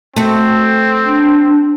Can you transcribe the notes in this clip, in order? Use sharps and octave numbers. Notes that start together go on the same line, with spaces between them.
A3 C4 F#4
D4